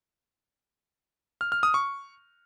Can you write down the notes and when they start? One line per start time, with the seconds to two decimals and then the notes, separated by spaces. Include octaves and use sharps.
1.41 F6
1.52 F6
1.63 D#6
1.74 C#6